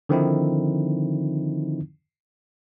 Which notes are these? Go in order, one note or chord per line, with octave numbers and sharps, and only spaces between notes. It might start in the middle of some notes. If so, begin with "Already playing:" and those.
D3 D#3 F3 C4 D#4 E4